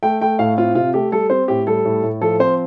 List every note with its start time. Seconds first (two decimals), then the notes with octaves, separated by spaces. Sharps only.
0.03 A3 G5
0.21 A3 G5
0.39 A2 F5
0.58 C4 F4
0.75 C3 F4
0.94 A3 G4
1.12 G3 A4
1.30 C4 C5
1.48 A2 G4
1.67 G3 A4
1.85 A2
2.03 A2
2.21 F3 A4
2.40 C4 C5